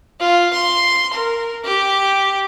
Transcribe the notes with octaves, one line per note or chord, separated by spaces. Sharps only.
F4
C6
A#4
G4